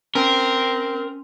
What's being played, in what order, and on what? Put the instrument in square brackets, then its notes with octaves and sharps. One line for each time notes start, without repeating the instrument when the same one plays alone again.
[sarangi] C4 [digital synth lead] C#4 [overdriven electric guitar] A#4